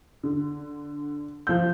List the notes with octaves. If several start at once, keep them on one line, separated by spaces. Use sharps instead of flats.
D3
F3 G6